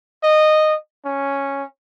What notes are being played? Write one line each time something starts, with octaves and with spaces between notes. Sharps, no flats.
D#5
C#4